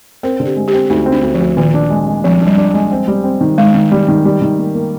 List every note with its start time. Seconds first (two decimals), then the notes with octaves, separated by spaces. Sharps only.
0.23 C4 A#4
0.40 D3
0.45 G4
0.56 G#3
0.68 G4
0.73 C4
0.90 D2 D#4
1.06 C4
1.12 D4
1.23 D2
1.34 F3
1.41 D2
1.57 A#2 D#3
1.74 D4
1.90 G#3
2.07 G#3
2.24 C2 F3
2.41 D4
2.47 G3
2.57 D4
2.74 G#3
2.92 C4
3.08 G3
3.24 C4
3.41 D#3
3.58 D#3 G#3
3.74 D#3
3.92 G3
4.08 D#3
4.25 G3
4.42 D#3
4.58 A#3
4.75 A#3